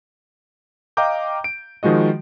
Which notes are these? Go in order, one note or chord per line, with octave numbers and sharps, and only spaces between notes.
D#5 F5 G5 A#5 D6 G6
D7
D#3 F3 G#3 F#4 D#5